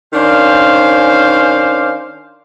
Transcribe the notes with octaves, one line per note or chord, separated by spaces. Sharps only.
D#3 C#4 D4 C5 F5